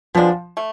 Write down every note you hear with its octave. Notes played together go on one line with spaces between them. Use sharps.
B2 F3 G#3 D4
A3